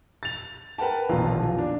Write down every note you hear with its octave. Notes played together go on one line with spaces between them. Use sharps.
A6 F7
A#4 B4 F#5 G5 A5
D#1 B1 F2 E3 F4 A#5
D4